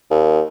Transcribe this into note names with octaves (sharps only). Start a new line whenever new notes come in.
D#2